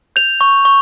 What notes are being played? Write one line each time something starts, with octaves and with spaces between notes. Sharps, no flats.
G6 F7
C#6
C#6